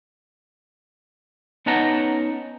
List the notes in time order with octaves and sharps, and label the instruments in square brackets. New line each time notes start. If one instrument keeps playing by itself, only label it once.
[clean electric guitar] B3 C#4 D#4 F#5 A5 A#5